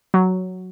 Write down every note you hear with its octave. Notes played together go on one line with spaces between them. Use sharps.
F#3